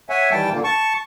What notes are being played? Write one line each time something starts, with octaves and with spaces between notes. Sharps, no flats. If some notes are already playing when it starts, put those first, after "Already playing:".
C#5 E5 F#5 G#5
D#3 E3 G3 G5 A5
A#2 D3 A#3
A5 C#6